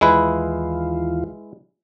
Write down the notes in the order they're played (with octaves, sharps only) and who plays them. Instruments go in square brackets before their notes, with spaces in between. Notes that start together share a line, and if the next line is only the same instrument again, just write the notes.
[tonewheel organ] D#2 E3 F4 [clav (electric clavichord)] G#3 E4 B4